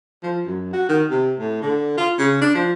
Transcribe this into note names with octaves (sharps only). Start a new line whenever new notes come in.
F3
F#2
F#4
D#3
C3
A2
D3
F4
C#3
D4
F3